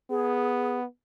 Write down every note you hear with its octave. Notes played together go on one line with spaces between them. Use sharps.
B3 G#4